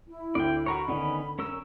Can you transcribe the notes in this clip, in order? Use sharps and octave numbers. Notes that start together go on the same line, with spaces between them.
E4
D2 D5 G5
F#4 A#4 C#5 B5
D3 D#3 B3 C#4 D4
C#4 A#4 E6